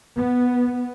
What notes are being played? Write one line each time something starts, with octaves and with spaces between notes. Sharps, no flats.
B3